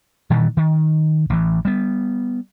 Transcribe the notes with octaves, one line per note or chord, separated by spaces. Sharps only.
A#2 D#3 E3 G3
D#3
A1 E3
G3 B3